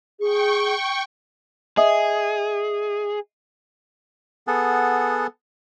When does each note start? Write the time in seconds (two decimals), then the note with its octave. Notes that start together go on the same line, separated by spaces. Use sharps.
0.20 G#4 G5 C#6
1.77 G#4 D#5 E5 D#6
4.47 B3 G#4 A4 F#5